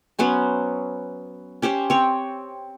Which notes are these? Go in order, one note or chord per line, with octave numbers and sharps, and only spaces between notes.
F#3 B3 C#4 C5
C#4 G4 C5 C#5
C4 C#5